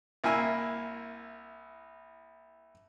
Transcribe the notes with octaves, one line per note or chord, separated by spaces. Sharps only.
C2 A#3 E4 G#5 E6